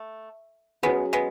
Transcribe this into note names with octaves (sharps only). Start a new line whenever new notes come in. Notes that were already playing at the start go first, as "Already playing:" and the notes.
Already playing: A3
F#3 G#3 B3 C#4 G#4
G#3 B3